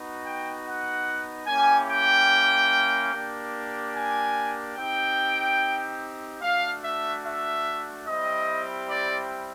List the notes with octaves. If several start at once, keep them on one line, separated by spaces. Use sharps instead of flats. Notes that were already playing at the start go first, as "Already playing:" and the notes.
Already playing: B3 D#4 F#4
G5
F#5
A#3 C#4 E4 G4 G#5
G5
A#3 D4 G4
G#5
C4 D#4 G4 G5
A3 D4 F#4 F5
E5
E5
G3 C4 E4 G4 D#5
D5